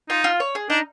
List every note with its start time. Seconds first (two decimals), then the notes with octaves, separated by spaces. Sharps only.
0.09 D#4 F4
0.24 F4
0.40 C#5
0.55 G#4
0.70 D4 D#4